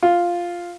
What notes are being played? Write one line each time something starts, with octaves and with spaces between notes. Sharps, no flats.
F4